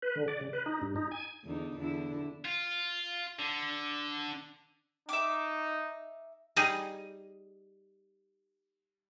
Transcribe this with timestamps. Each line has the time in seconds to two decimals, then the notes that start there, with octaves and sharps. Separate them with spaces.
0.02 B4
0.16 D3
0.28 D5
0.41 C#3
0.53 B4
0.66 D#4
0.81 G2
0.96 D#4
1.11 G#5
1.44 E2 D3 D#4
1.77 E2 D3 E4
2.45 F4
3.39 D3
5.09 D#4 E5 D6
6.56 G3 D#4 G#4